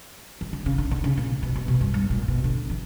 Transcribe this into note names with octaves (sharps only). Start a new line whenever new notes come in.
E3
D3
C#3
D3
D3
C#3
A#2
B2
B2
B2
G2
G2
A#2
B2
D3
E3